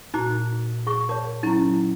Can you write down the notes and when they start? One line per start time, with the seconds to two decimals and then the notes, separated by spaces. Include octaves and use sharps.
0.14 A#2 D#4 F#4 A5 A#5
0.87 G#4 C#6
1.09 A#4 C#5 A5
1.43 F#3 C#4 D#4 E4